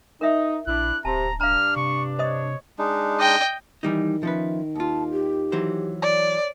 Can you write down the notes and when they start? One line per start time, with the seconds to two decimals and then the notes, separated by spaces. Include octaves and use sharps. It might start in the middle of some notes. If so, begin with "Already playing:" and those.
0.21 D#4 A#4 E5
0.67 A#1 D4 E4 F#6
1.05 D1 C3 A5 A#5
1.41 G2 D4 F5 A#5 F6
1.76 C3 C#6
2.19 C5 C#5 D#5 D#6
2.79 G#3 D4 D#4
3.20 D#5 G5
3.83 D#3 E3 G3 D#4
4.23 F3 C#4 B4 E5
4.76 D#2 F4 A5
5.12 G4
5.52 E3 F#3 C5
6.02 C#5 D5